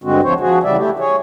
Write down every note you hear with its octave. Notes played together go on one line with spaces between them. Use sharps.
G2 D3 G#3 C4 F#4
D2 F3 C4 C5 C#5
F3 F#4 G#4
E2 C#3 G3 D5 E5
A3 E4 G4
G#4 C#5